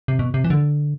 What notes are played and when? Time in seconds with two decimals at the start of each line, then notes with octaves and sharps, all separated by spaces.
0.08 C3
0.19 B2
0.34 C3
0.44 E3
0.50 D3